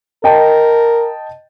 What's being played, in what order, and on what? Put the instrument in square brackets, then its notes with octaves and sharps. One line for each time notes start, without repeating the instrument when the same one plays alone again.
[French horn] A#4 [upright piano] D#5 G5 A5